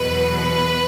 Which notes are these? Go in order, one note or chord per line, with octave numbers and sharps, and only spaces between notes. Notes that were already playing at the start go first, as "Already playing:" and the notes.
Already playing: E2 B2 F#3 B4
B4